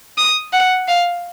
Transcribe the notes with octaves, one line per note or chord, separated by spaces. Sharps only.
D#6
F#5
F5